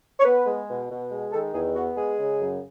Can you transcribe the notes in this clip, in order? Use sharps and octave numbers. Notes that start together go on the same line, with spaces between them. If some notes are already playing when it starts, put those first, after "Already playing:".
C#5
B3 B4
G#3
B2
B2
G#3
D#3 A4
E2 G#4
B3 F#4
G#3 G#4
C#3
F#2